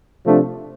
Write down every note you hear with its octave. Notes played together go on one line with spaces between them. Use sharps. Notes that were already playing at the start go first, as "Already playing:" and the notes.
C3 F3 A3 D4